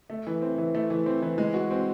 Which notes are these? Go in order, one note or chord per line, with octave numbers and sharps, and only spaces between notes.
A3
E3
C4
E3
A3
E3
C4
E3
G#3
F#4
C4